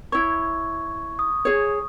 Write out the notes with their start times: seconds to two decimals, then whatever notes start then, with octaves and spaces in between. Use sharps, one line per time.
0.12 E4 C#5 C#6 G#6
1.19 D#6
1.45 G#4 C#5